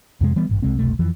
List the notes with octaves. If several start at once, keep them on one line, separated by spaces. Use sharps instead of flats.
F2 C3 G#3
E3 G3 B3
A1 G2
C2 C3 G#3 C4
F1 C2 B2 A3
F2 E3 F3